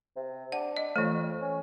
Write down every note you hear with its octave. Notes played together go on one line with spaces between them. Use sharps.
C3
D4 F#5
D#5
F2 E3 A3
C#4